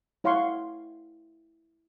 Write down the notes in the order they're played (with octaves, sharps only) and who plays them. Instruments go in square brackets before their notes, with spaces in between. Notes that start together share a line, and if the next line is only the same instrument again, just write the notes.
[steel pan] E4 C#5 F5 F#5 C6 C#6